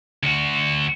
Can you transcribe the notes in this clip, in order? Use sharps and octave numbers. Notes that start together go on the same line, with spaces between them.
D2 F#4